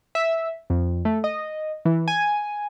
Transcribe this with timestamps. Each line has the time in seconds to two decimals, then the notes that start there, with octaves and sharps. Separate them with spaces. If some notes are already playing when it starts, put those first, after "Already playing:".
0.15 E5
0.70 F2
1.05 A3
1.24 D#5
1.85 E3
2.08 G#5